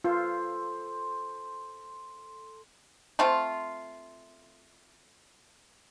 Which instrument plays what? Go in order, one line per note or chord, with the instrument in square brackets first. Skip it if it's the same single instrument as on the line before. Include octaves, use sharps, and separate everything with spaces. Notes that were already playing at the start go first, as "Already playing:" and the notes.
[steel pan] F4 [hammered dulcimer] A4 C5
[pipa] A3 C4 F4